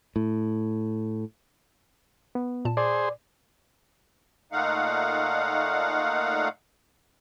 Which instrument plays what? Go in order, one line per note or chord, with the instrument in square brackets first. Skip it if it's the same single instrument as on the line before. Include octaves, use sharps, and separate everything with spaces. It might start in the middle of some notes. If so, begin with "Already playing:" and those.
[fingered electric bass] A2
[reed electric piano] B3
[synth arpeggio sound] A#2 A5
[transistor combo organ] G#4 C5 [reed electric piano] D5
[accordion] A#2 A3 D#4 F5 F#5